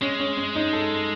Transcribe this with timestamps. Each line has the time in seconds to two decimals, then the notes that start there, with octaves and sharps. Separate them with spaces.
0.01 G#3 C#4
0.20 C#4
0.37 C#4
0.56 D#4
0.73 A4